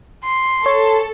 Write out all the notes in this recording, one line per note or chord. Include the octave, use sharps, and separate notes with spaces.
C6
A4 C#5